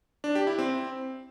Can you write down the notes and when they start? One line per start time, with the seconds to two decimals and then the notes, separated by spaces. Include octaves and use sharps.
0.24 D4
0.35 G4
0.47 E4
0.58 C4